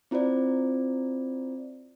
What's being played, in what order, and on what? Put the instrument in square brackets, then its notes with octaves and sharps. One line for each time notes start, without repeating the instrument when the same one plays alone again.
[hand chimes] C4 E4 F4 C5 D5